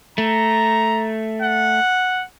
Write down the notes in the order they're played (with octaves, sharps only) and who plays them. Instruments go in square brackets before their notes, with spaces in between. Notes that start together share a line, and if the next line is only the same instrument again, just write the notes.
[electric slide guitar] A3 [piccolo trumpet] A#5
[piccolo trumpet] F#5